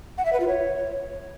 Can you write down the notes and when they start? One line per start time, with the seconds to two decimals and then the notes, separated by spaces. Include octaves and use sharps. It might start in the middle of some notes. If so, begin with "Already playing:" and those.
0.18 F#5
0.25 E5
0.33 B4
0.40 F4
0.48 C#5